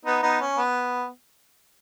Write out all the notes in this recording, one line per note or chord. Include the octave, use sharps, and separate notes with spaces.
B3 D#4
B3 D#4
C#4
B3